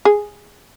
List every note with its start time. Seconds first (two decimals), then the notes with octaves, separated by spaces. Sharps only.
0.05 G#4